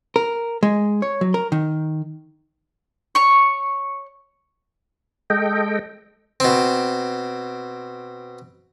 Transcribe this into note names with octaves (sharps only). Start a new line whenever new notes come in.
A#4
G#3
C#5
F#3
A#4
D#3
C#5 C#6
G#3 A4 D#5 G5
B2 C4